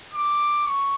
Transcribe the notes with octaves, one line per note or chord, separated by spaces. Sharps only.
D6
C#6